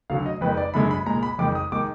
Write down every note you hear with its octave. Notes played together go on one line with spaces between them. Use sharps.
D2 D3 F#3 F5
D#5
F2 D#3 G#3 B4
D5
F#2 D3 G#3 B5
B5
A#2 G#3 A#5
B5
F2 D#3 G#3 D6
D#6
D#3 G#3 D6